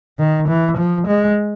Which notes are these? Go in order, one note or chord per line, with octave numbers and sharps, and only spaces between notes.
D#3
E3
F3
G#3